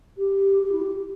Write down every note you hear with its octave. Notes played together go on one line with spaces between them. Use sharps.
G4
G4
E4
G4